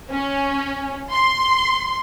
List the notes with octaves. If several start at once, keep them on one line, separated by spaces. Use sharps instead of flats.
C#4
C6